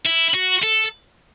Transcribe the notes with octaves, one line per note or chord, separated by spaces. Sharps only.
E4
F#4
A4